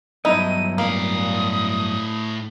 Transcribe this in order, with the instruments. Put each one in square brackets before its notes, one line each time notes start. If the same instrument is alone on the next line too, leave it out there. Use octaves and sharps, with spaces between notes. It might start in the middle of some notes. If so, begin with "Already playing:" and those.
[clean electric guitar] G2 F#3 B3 [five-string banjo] D#4 E4 [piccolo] D#7
[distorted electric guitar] A2 F5 [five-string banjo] A#3 [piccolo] D#6